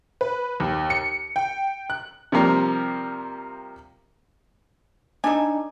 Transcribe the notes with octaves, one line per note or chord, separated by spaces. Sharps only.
B4
D#2
C#7
G5
F#6
C3 F3 G3 A#3
D4 D#4 A4 G#5